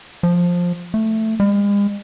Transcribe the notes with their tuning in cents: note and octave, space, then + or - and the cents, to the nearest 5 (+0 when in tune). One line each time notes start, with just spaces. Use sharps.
F3 +10
A3 +5
G#3 -45